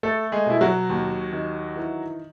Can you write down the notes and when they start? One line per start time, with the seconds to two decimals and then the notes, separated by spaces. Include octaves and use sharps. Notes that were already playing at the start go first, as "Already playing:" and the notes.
0.03 A3 A4
0.32 G#3 G#4
0.46 B2 E4
0.61 F#3 F#4
0.90 D#2
1.33 D#3
1.76 E3